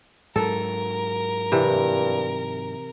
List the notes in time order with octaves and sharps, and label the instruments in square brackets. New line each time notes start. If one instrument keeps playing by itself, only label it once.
[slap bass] G#2 F#3 [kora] A4 [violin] A#4
[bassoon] G2 [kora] C3 E3